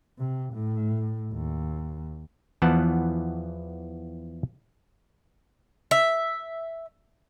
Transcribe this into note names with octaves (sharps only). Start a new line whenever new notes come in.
C3
A2
D#2
E2 E3 F3 B3 F#5 A5
E5